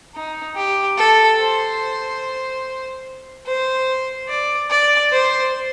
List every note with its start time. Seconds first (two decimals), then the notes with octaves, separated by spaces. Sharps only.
0.15 D#4
0.56 G4
0.98 A4
1.39 C5
3.47 C5
4.29 D5
4.70 D5
5.12 C5